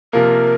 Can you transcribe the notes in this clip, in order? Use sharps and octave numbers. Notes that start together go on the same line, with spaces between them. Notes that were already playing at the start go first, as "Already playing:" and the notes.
C3 F3 A#3 A#4